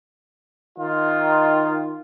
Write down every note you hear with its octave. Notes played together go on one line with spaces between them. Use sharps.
D#3 F4